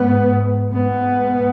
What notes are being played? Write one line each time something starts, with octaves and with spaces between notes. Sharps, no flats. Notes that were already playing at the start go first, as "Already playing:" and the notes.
Already playing: G#2 B3
G#2 B3